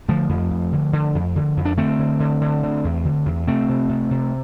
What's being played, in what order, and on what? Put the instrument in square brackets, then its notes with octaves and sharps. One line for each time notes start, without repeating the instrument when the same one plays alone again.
[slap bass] D3 F3 A3
F2
F2
D3
D3
F2
D3
F2
D4
D3 A3 C4
D3
D3
D3
D3
E2
D3
E2
C3 A3 C4
C3
C3
C3